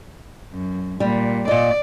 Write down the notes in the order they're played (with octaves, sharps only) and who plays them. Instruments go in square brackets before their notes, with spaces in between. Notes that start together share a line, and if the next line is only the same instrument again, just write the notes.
[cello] F#2
[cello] A#2 [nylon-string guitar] G3
[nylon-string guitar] A#2 D#5 [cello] D5